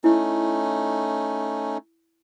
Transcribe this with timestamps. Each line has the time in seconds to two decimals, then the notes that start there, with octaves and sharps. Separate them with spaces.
0.04 A3 C#4 D#4 E4